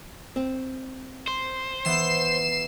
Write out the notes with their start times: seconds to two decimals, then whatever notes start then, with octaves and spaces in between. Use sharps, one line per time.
0.36 C4
1.28 C5
1.85 E3 B3 E5 C7 E7